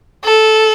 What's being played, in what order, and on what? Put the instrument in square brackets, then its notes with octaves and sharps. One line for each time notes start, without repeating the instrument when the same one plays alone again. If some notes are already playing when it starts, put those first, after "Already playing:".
[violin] A4